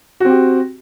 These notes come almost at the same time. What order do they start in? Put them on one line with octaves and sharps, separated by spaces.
F#4 C4 G4